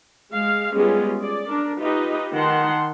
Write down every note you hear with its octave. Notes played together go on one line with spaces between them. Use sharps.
G#3 F5
G3 G#3 B3 C#4 F4 G#4
G#4 D5
D4 A#4
D#4 F4 G4 B4 D#5
D#3 F#5 A5 C6